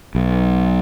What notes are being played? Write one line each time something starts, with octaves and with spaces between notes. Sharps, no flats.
B1